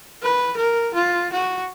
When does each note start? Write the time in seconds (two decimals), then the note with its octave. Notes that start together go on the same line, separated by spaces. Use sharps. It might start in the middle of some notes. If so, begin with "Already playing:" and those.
0.23 B4
0.57 A#4
0.94 F4
1.33 F#4